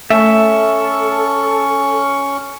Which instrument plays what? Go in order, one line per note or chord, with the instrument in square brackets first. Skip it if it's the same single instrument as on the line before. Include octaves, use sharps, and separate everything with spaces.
[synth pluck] A3 [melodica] C#4 C#6 [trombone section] A4 [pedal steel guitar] E5